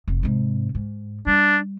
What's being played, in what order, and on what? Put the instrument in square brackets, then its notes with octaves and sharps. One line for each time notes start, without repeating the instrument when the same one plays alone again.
[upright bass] F1
G#2 C3
G#2
[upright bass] G3 [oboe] D4